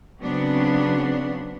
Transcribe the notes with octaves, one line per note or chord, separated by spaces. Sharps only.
C#3 F#3 B3 C4 D4